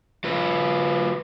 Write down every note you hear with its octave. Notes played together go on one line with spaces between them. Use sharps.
F#3 F4 B4